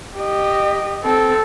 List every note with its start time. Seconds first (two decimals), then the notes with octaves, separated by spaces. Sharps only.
0.16 G4 D#5
1.04 C4 A4